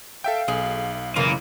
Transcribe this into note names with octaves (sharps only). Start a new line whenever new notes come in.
A4 E5 F5 G5
B1 G#4
F#2 C#3 E3 A#3 F4 A#4